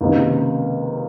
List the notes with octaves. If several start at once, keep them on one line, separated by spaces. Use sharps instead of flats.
C#2 C3 D#3 A#3